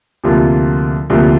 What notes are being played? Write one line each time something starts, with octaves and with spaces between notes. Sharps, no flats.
D2 C3 F3 A#3 F4
D2 C3 F3 A#3 F4